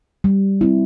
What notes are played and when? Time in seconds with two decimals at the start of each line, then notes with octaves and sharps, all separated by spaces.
0.24 G3
0.61 C4 E4